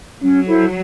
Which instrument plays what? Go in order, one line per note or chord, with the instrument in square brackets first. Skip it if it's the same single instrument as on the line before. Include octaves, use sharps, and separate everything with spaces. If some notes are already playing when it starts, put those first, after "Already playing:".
[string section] F#3 [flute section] C#4
[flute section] E4 A4 C5